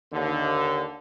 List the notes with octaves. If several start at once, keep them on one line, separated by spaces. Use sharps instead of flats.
D#2 D3